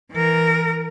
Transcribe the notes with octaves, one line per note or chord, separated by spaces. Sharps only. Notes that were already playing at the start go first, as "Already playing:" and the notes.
E3 A#4